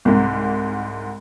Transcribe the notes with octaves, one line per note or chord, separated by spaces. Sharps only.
C2 G#2